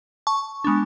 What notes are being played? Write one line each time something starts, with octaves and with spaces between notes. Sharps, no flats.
A5 C#6
G#3 B3 D4